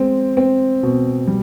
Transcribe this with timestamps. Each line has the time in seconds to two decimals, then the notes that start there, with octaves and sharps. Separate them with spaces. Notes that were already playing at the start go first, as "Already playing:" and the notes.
Already playing: G#3 C4
0.37 C4
0.83 B2
1.27 G3